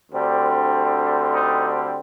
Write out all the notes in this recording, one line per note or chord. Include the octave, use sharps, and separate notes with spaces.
D2 D3 G3 C4
D#4